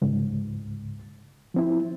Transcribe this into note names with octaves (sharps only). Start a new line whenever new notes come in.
C#2 G#2
F3 C4 E4